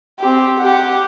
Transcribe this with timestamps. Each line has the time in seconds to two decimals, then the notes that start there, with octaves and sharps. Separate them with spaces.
0.19 C4 G4
0.59 G4 F#5